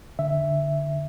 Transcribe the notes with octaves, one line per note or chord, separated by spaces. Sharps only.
D3 E5